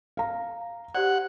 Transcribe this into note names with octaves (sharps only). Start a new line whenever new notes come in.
F5 A#5
G4 C5 D5 F#5